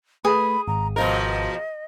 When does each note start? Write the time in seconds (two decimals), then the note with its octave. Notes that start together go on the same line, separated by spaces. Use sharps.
0.25 A3 G#4 B4 B5
0.68 G#1 A#5
0.96 B2 F3 A#4 D#5